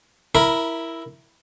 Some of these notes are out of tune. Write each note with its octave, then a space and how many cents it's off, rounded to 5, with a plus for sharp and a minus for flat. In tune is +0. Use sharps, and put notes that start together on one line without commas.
E4 +0 A#4 +0 B5 -20